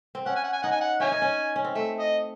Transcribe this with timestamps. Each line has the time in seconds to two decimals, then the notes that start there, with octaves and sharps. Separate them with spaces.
0.15 C4
0.26 C#4 F#5
0.36 G#5
0.44 F#5
0.53 G#5
0.63 D#4 F#5
0.72 G#5
0.81 F#5
1.00 C#4 C#5 E5 G#5
1.12 D#4
1.22 C#4
1.56 C#4
1.64 C4
1.75 A3 E5
1.99 D#5